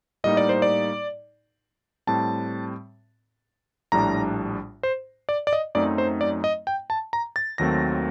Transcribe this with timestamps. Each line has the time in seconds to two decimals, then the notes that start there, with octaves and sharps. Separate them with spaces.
0.24 A2 G3 A#3 D#4 D#5
0.37 D5
0.49 C5
0.62 D5
2.07 A2 G3 C4 A5
3.92 A#1 A2 G3 D4 A#5
4.83 C5
5.29 D5
5.47 D5
5.53 D#5
5.75 F#2 F#3 A3 C4 D#4 D5
5.98 C5
6.21 D5
6.44 D#5
6.67 G5
6.90 A5
7.13 A#5
7.36 A6
7.58 D#2 D#3 F#3 A3 C4 A#6